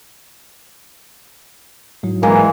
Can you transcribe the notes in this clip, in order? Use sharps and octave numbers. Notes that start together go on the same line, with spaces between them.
G#2 F#3 E4
E3 G#3 A#3